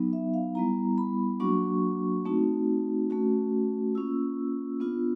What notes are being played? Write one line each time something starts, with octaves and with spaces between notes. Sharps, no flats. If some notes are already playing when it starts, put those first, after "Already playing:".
Already playing: F#3 B3 D#4
E5
F5
G3 B3 E4 A#5
B5
F#3 A#3 D4 F#4 C#6
A3 C4 D#4 F#4
A3 C#4 F#4
A#3 C#4 F4 E6
B3 D4 F4